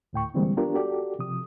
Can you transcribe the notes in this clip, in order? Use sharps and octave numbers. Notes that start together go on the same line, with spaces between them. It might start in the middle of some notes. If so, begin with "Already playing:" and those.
D2 A2 G5 C#6
D3 E3 G3 G#3 A#3 C4
B3 D4 F4 G4 A#4
F#4 G4 A4 D5
C3 F3 D#6